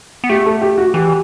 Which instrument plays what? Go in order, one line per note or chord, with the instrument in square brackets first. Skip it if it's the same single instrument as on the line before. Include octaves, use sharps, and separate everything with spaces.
[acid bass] B3
[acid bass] A3 [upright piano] G4
[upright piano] A4
G4
F#4
[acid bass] E3 [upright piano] G4